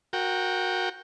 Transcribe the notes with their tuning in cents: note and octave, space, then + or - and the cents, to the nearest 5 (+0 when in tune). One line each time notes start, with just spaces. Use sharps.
F#4 -20 A#4 +0 G5 +0